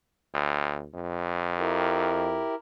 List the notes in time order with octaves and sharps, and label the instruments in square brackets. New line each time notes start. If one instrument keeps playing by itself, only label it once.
[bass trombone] D2
F2
[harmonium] E4 G4 A#4